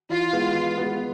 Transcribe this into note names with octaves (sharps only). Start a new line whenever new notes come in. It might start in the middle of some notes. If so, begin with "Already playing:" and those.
E3 F4
G#3 B3
E3
G#3 B3